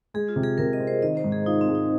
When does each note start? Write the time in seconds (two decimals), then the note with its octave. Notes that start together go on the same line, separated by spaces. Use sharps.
0.14 G#3 G#4
0.29 F4
0.36 C3
0.43 G#4
0.58 C3 A#4
0.73 D#5
0.80 C4
0.87 C5
1.02 D#3 D#5
1.17 C5
1.24 G#2
1.32 G#4
1.46 D#4 F4
1.61 C4
1.68 G#3
1.75 D#4